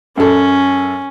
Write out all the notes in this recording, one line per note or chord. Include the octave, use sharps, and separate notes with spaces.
F#2 C#4 A4